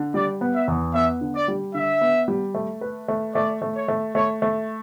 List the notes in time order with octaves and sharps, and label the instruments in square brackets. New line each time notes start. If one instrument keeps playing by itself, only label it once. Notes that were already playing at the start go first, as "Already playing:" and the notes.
Already playing: [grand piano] D3
[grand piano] G3 [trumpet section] D5
[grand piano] B3
[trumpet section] E5
[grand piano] E2
[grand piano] B3 [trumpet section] E5
[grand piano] D3
[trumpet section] D5
[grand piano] G3
[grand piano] D3 [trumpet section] E5
[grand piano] B3
G3
A3
B4
A3
[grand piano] A3 [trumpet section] D5
[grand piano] A3
[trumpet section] C#5
[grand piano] A3
[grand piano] A3 [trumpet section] C#5
[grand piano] A3